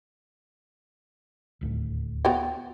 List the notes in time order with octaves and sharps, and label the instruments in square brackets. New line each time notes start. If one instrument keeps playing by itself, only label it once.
[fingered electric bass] D#1 D2 A2
[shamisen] B3 F#4 G5